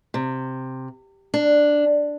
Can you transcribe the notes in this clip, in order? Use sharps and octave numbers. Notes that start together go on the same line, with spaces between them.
C3
D4